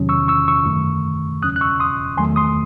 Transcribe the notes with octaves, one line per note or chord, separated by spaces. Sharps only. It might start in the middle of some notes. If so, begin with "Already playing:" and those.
Already playing: E2 C3 D#3 F#3 C#4
C#6 E6
C#6 E6
C#6 E6
F#2 D#3 A3
E2 C#3 F#3 C#4 D#6 F#6
F#6
C#6 E6
C6 D#6
E2 D#3 F#3 A3 G#5 C6
C6 D#6